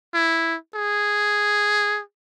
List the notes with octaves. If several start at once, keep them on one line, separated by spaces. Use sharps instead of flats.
E4
G#4